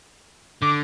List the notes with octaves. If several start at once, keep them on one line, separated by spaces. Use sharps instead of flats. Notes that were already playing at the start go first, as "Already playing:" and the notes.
D3 D6